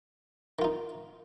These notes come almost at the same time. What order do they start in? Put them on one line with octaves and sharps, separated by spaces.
D#3 F4 D#4